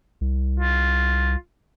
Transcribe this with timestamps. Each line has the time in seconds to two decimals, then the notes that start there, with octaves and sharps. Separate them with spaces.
0.21 C2
0.59 F4